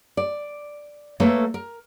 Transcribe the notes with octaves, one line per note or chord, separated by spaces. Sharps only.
D5
A3 A#3 A4 B4 C#5
A#4